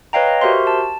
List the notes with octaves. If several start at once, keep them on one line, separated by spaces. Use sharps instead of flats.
B4 C#5 D#5 F5 G5 A#5
F#4 G4 A#4 C5 E5 C6
A5